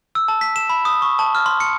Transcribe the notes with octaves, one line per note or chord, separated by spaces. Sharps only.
E6
A5
B6
E7
B5
D#6
C#6
A5
F6
C6
C#7